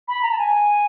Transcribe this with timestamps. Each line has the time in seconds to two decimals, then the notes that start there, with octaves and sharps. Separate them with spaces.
0.08 B5
0.22 A#5
0.32 A5
0.38 G#5